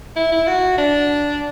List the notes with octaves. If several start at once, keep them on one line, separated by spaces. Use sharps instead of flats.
E4
E4
F#4
D4